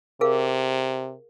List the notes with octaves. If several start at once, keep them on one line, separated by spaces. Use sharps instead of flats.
C3 G#4 A#4 F5